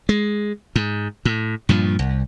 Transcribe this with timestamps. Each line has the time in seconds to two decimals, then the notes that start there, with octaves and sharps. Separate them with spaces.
0.09 G#3
0.76 G#2
1.25 A2
1.69 G2 A#2 F3
1.99 C2